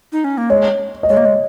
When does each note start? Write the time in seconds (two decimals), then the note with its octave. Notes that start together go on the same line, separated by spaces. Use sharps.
0.12 D#4
0.24 C#4
0.38 A#3
0.50 G#3 C#5
1.03 D#5
1.09 G#3 C#5
1.17 A#3
1.25 G#3